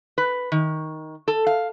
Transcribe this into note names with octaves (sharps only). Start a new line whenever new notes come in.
B4
D#3
A4
F5